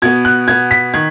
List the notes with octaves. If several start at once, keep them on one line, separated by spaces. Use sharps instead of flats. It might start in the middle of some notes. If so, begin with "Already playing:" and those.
B2 B3 G#6
F#6
B2 B3 G#6
B6
D#3 G#6